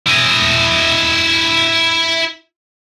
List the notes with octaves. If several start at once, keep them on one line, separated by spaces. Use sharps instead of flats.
E4 D#5